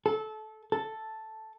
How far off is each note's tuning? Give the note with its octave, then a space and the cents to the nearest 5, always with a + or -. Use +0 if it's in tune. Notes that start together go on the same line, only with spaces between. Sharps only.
A4 -20
A4 +0